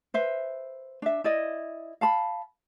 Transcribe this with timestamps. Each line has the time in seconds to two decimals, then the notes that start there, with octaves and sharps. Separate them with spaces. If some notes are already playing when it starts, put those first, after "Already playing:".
0.14 B4 C5 E5
1.02 D4 E5
1.24 E4 D5 D#5
2.01 F5 A5 B5